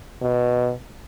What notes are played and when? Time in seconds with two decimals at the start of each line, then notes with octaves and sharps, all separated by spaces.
0.22 B2